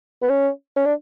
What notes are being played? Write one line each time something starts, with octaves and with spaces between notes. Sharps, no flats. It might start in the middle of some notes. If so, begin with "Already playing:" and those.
B3
C#4
C#4
D4